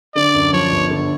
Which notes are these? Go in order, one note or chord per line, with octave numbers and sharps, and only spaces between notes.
D3 D5
F#2
F3 C#5
G1
D3